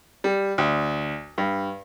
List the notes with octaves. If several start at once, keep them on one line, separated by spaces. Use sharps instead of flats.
G3
D2
G2